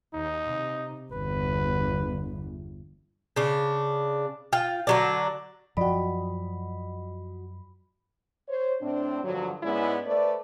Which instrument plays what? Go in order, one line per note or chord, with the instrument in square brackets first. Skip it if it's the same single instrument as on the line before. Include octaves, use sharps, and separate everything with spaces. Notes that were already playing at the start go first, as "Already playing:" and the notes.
[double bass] D#2 [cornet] D#4
[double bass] C3
[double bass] G1 E2 [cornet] B4
[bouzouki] C#3 D4
F4 G5
D3 F#3 D4
[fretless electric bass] F#2 F3 [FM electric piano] F#4 D#5 [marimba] D5 G5 [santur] B5
[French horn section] C5 C#5
A2 C4 D4
G2 D3 F3 F#3
G#2 G#3 B3 C#4 E4 D5
A3 B4 C5 D5